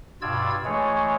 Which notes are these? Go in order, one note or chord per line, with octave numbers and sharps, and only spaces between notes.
G2 B2 F4 D5 E6 G#6
E3 G#3 A3 G#4 C#5